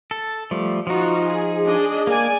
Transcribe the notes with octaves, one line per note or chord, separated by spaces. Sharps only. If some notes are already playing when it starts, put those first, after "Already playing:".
A4
F3 G3 A3
F3 D#4 F4 F#4
G#4
D4 G#4 D#5
A#3 D5 G#5